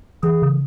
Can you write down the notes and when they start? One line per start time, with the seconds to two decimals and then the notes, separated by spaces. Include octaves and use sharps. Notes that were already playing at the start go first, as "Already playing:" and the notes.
0.23 E3 G#4
0.42 C#3